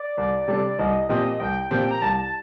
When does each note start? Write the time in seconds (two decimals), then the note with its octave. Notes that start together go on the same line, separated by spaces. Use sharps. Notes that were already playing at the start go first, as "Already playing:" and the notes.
Already playing: D5
0.17 C2
0.48 C3 G3 D4 A4
0.79 C2 D#5
1.09 A#2 F3 C4 G4 D#5
1.40 C2 G5
1.71 A#2 F3 C4 G4 G5
1.91 A#5
2.02 C2 A5